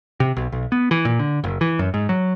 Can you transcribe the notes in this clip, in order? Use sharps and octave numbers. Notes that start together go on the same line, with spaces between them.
C3
B1
B1
B3
E3
A#2
D3
F#1
E3
F#2
G#2
F#3